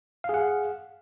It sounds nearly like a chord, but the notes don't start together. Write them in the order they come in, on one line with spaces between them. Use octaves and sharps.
F5 G#4 F#5